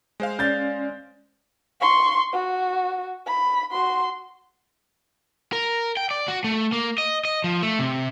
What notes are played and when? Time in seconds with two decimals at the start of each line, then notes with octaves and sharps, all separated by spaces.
0.20 G#3 C5 F5
0.39 C#4 D5 G6 A6
1.81 C6 C#6
2.33 F#4
3.26 B5
3.72 F#4 C6
5.53 A#4
5.97 G5
6.11 D5
6.28 F#4
6.44 A3
6.72 A#3
6.98 D#5
7.25 D#5
7.44 F3
7.63 A3
7.79 C3